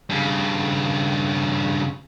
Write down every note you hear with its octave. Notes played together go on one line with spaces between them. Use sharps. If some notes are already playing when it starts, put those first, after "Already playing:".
G2 C#3